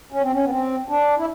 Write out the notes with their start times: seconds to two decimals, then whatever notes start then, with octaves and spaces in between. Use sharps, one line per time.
0.12 C#4
0.22 C4
0.32 C#4
0.44 B3
0.50 C4
0.89 D4
1.18 E4